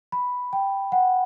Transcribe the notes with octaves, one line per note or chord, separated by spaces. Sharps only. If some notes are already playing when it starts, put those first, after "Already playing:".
B5
G5
F#5